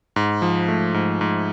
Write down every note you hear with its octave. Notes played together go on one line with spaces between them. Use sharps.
G#2
F3
A3
G#2
G#2